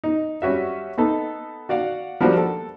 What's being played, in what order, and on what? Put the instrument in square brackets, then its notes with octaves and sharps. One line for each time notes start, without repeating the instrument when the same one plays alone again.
[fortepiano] D#4
G3 C#4 F#4 E5
B3 D#4 A4
F#4 D5 F5 F#5
F3 G3 A#3 D4 F#4 C5
A4